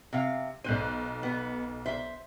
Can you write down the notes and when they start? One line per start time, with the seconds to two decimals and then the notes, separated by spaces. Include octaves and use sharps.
0.13 C3 F5
0.64 B1 C5 F#6 D#7
1.23 B3
1.86 C5 E5